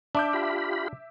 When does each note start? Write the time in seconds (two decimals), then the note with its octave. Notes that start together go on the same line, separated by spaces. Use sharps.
0.15 D4 E5 D6 G6
0.33 F4 G4 B5